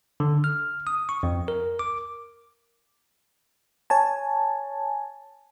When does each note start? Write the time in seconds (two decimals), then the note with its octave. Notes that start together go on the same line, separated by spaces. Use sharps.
0.20 D3
0.44 F6
0.87 D#6
1.09 C#6
1.23 F2
1.48 A#4
1.79 D6
3.90 C#5 G#5 A5